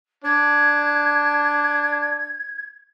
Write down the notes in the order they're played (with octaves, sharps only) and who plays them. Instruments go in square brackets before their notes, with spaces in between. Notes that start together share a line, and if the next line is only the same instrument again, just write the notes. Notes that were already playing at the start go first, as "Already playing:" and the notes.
[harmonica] D4 [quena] G#6